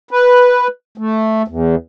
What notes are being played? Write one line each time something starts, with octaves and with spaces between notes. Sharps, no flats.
B4
A3
E2